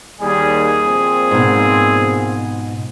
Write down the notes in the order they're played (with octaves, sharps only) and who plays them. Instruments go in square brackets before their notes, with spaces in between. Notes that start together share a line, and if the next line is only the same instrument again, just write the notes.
[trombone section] D#2 G3 [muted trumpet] G#4
[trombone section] A#2 F3 C4
[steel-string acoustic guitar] G#2 B2